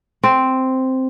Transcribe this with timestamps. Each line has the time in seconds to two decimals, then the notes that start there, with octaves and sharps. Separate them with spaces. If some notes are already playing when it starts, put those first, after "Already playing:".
0.23 C4